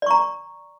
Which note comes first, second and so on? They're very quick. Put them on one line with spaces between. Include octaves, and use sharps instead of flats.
D5 C#6 A#5